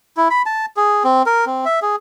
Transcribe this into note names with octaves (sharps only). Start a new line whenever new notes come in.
E4
B5
A5
G#4
C4
A#4
C4
E5
G#4